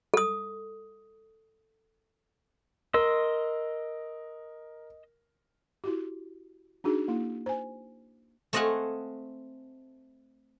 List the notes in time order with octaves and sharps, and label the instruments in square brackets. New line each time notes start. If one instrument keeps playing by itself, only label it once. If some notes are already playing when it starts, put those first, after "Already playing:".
[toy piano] A4 D#6
[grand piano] A#4 [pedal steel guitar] D#5 C6 E6
[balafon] E4 F#4 G4
D4 D#4 F#4 G#4
A#3 E4
C5 G#5
[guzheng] A3 C4 D#5 F5 F#5 G#5